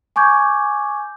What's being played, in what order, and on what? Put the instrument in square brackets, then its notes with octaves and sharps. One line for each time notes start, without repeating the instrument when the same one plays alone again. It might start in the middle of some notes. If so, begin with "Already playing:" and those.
[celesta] G#5 C#6 D6 G6 G#6